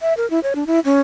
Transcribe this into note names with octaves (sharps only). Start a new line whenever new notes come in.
E5
A#4
E4
C#5
D4
E4
C#4